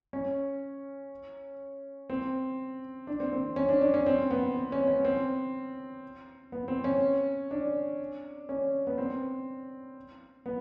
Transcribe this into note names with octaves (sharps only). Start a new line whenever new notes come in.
C#4
C4
D4
C4
C4
C#4
D4
D4
C#4
C4
B3
C4
C#4
C#4
C4
B3
C4
C#4
D4
C#4
B3
C4
B3